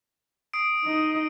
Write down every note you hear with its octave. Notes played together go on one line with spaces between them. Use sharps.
D#6 C7 D7
D#4 D#5